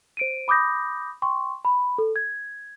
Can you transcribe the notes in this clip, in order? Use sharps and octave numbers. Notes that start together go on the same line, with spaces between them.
C5 D7 D#7
B5 D6 D#6 G6 A#6
G5 C6 C#6
B5
A4
G#6